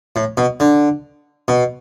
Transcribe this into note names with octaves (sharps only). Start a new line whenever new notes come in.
A2
B2
D3
B2